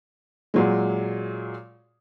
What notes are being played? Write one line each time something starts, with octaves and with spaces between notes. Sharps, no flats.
A#2 F#3 G#3